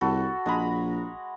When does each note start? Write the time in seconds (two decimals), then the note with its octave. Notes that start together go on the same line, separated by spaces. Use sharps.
0.01 C2 F#4 A4 B5
0.46 A#1 G#3 A#5 B5